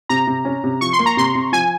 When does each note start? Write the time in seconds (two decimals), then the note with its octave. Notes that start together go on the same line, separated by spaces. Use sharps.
0.09 C3 A#5
0.27 C3
0.45 C#4
0.64 C3
0.81 F3 C#6
0.93 C6
0.99 A#3
1.06 A#5
1.17 C3 C6
1.35 C3
1.52 F3 G#5